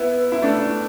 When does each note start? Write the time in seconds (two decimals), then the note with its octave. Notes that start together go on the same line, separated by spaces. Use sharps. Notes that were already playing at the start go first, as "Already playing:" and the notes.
Already playing: B3 E4
0.32 E4
0.42 A3 D4